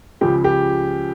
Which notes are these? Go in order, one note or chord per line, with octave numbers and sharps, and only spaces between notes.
C#2 C#3 F3 G4
G4